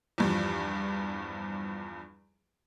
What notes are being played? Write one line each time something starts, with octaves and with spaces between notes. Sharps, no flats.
E2 G2 F3